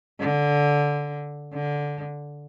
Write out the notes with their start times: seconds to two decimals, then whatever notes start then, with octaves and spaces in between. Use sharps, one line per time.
0.20 D3
1.53 D3